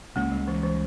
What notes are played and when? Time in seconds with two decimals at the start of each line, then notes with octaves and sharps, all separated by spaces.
0.16 C#2 C#3 A#3
0.32 G3
0.48 E3
0.63 E3